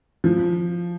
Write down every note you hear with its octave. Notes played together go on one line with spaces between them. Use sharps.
F3